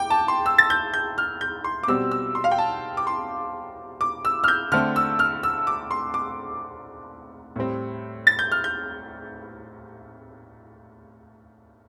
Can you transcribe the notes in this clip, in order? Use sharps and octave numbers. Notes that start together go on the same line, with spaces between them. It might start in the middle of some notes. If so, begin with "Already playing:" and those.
Already playing: G5 D6
A5
C6
E6
A6
G6
G6
F6
G6
C6
D6
B2 G3 C4 E6
E6
C6
F5
G5
A5
D6
C6
D6
E6
F6
G6
D3 A3 C4 F6
E6
F6
E6
D6
C6
D6
A2 G3 C4
A6
G6
F6
G6